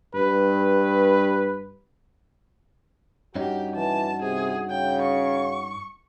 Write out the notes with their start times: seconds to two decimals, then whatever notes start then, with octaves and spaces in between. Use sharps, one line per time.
0.15 G2 B4
3.35 G2 C#4 D#4 F#4 G4
3.76 E3 A5
4.22 C3 G#4
4.70 C#3 G5
5.02 C#6